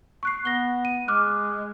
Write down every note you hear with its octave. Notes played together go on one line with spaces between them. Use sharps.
C#6 F#6 C7
B3 A#6 G7
D#7
G#3 D6 F6 F#6